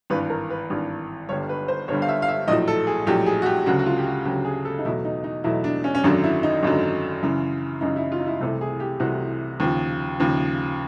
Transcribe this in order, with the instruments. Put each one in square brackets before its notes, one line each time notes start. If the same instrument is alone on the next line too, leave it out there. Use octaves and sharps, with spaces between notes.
[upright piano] G#1 G2 E3 B4
A#4
B4
G#1 G2 E3
G1 G2 D3 G3 C#5
B4
C5
G1 G2 D3 G3 C#5
F5
E5
F5
E5
A#1 D#5
A2 F#3
A4
G#4
A#1 A2 F#3 G4
G#4
F#4
G4
D2 C#3 F#3 F#4
F#4
F4
G4
F#4
D2 C#3 F#3 G4
G#4
A4
D#4
E2 B2 F#3 A3 E4
D#4
D#4
E2 B2 F#3 A3 E4
D4
C#4
C#4
G#1 F#2 D3 F#3 D4
E4
D#4
G#1 F#2 D3 F#3
F#2 C#3 E3
F#2 C#3 E3 D#4
E4
F4
D#4
E4
C2 C3 E3 A3 A4
G#4
G4
C2 C3 E3 A3 F#4
D#2 C#3 F3
D#2 C#3 F3